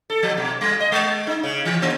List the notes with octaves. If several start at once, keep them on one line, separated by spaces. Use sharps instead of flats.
A4
F3
B2
G3
D#5
G#3
D#4
C#3
E3
A#3